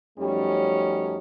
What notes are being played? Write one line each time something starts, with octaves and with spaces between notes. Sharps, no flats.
F#2 F3 G3 A3 C#4 D#4